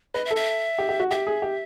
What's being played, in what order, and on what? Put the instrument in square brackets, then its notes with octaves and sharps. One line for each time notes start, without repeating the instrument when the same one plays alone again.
[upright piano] B4 [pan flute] D#5
[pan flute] E5
[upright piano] A4
[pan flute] E5
[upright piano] G4
G4
F#4
[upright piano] G4 [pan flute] E5
[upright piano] G#4
G4